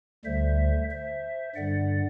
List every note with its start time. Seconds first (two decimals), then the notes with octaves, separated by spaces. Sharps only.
0.24 D2 D3 G3 C5 E5
0.90 C5 E5
1.56 G2 D3 G3 D5 F#5